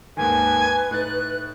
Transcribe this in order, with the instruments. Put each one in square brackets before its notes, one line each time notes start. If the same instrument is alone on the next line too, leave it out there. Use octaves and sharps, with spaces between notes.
[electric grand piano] D#2 G#2 D#3 [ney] B4 [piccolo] G#5
[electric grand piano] A2 D#4 A6 [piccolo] F#6